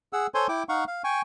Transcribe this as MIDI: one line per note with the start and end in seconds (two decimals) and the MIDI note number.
0.13 0.27 68
0.13 0.27 78
0.13 0.27 88
0.34 0.47 69
0.34 0.47 72
0.34 0.47 73
0.34 0.47 80
0.34 0.47 84
0.49 0.63 64
0.49 0.63 79
0.49 0.63 86
0.69 0.84 63
0.69 0.84 77
0.69 0.84 78
0.69 0.84 85
0.87 1.02 77
1.04 1.22 79
1.04 1.22 80
1.04 1.22 85